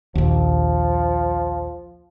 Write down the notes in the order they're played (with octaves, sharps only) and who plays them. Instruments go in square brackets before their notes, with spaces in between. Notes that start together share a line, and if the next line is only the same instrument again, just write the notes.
[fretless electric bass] A#1 D#2 [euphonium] F3